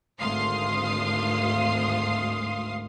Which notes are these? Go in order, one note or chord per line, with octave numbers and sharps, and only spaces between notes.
G#1 D2 F5 C6 D#6 C7